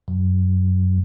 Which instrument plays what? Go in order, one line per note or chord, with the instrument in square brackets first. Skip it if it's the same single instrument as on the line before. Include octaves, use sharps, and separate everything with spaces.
[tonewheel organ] F#2